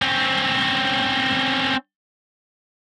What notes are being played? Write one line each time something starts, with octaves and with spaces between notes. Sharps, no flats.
C4 C#4